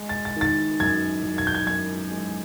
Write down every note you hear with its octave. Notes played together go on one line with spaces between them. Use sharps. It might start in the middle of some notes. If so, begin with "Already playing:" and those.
Already playing: G#3
A6
A6
D#3
A6
F#2 G#6
F#2
G#6
G6
G#6
F#2 G#6
G#3